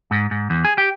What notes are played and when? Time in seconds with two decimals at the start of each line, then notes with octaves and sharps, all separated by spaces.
0.11 G#2
0.31 G#2
0.50 E2
0.65 G#4
0.78 G4